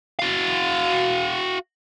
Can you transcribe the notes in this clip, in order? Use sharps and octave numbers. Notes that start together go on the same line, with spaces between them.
F#4 F5